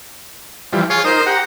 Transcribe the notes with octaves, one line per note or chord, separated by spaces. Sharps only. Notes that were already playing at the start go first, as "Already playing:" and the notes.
E3 F3 G3
F4 G#4 C#5
D#4 A#4 C5 D#6
G4 F#5 A#5